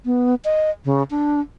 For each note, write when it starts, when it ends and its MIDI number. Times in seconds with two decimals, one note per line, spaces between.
0.06 0.35 59
0.45 0.71 75
0.85 1.03 49
1.11 1.40 62